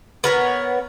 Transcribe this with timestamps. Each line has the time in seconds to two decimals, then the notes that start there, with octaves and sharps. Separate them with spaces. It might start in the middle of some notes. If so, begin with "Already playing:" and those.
0.24 B3 A#4 C#5